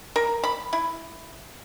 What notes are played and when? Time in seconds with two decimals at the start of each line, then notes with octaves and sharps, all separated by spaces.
0.16 A#4
0.44 B5
0.73 E4